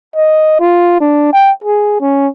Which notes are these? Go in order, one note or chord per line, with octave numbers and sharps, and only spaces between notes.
D#5
F4
D4
G5
G#4
C#4